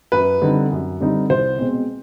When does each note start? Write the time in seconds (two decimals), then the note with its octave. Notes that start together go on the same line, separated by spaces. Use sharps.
0.12 F#2 B4
0.42 D3 G3 C4 D#4
0.71 F#2
1.00 D3 G3 C4 D#4
1.30 C2 C5
1.59 B2 G#3 C4